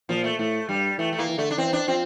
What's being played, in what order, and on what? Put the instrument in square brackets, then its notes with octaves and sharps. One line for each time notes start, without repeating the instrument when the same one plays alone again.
[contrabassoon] A#2 [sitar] F3
[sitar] A3
[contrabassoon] A2 [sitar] A3
[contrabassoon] G2 [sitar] G3
[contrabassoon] E3 [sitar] A3
[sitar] A3
[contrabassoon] E3 [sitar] A#3
[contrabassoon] E3
[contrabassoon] D3 [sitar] A3
[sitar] D4
[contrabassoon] E3 [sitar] C4
[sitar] D4
[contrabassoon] F3 [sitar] C4